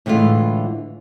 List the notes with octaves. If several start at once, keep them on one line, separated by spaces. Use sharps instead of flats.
A2 D3 E3 G#3 F4